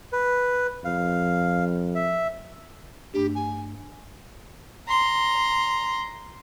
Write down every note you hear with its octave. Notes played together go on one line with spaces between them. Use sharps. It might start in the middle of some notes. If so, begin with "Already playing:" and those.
B4
F2 F5
E5
G2 A3 D4 G4
G#5
A#5 C6